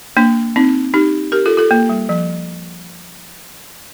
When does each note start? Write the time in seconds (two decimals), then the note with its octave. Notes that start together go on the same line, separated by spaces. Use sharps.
0.17 A#3 D4
0.56 C4 D#4
0.94 D#4 G4
1.32 G4 A#4
1.46 F4 A4
1.57 F4 A4
1.71 A#3
1.89 G3
2.09 F3